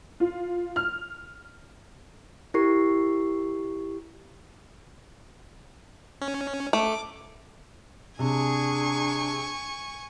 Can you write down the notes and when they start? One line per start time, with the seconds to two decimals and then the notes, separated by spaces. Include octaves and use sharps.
0.20 F4
0.76 F6
2.54 E4 G4 A#4 C#6 C7
6.21 C#4
6.73 A3 D6
8.19 C3 D4 G#4 G#5 C#6